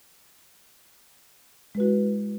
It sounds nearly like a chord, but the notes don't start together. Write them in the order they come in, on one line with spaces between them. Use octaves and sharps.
G#3 B4 F#4 E4